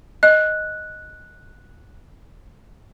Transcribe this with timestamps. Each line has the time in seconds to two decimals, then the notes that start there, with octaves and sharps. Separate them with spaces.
0.23 D#5 F#6